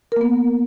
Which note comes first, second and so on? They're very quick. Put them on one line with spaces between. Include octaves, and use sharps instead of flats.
A#4 A#3 B3